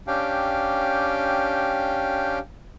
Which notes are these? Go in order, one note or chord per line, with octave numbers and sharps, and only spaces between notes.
C#4 D4 G4 F5 G5